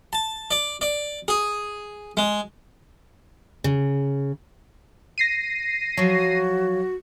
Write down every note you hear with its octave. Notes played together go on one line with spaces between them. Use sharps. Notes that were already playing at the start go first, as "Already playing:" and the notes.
A5
D5
D5
G#4
G#3
C#3
A#6 C7 D#7
F3 F#3 F#4